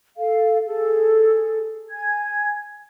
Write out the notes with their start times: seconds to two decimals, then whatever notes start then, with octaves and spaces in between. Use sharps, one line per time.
0.17 A4 F5
0.66 G#4 A4
1.91 G#5 G#6